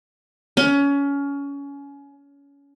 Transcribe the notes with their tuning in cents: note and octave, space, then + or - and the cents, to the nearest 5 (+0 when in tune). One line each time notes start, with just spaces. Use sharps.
C#4 +25